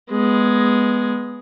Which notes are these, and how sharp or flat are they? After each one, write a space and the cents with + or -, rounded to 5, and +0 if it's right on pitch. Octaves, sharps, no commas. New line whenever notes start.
G#3 +5 B3 -5